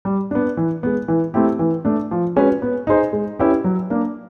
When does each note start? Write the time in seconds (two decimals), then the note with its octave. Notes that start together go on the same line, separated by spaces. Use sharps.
0.05 G3
0.31 B3 D4
0.57 E3
0.83 G#3 B3
1.08 E3
1.34 A3 C4 E4 G4
1.59 E3
1.85 A3 D4
2.11 F3
2.36 G#3 C#4 F#4 B4
2.62 B3
2.87 D#4 G#4 C5 D#5
3.13 G#3
3.39 C#4 E4 G4 B4
3.64 F#3
3.90 A#3 D4